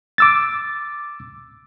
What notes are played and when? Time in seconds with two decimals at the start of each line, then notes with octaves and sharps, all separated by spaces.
0.18 D6 E6 A6